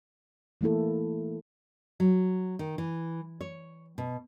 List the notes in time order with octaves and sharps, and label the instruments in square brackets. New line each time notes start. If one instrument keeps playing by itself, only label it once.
[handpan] E3 A3 A#3 E4 A4
[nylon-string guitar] F#3
D#3
E3
C#5
B2